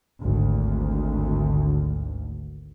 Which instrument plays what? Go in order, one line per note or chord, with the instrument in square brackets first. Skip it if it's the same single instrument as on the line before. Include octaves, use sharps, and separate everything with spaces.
[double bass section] G#1 D2